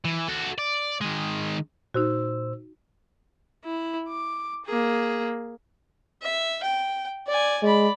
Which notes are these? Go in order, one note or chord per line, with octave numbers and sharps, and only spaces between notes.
E3
F#4 A4
D5
D#3 G#3
A#2 D#4 F#4 C5 E6
E4
D6
A#3 G#4
E5
G5
D5 G#5
G#3 D5 B5